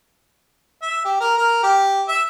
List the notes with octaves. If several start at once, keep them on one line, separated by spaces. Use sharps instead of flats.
E5
G4
A#4
A#4
G4
E5